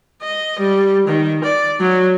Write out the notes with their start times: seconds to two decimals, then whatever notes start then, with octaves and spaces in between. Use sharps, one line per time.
0.22 D#5
0.59 G3
1.08 D#3
1.43 D5
1.81 F#3